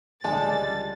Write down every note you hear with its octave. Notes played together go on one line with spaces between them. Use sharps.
C#2 D3 G3 G#3 A5 A6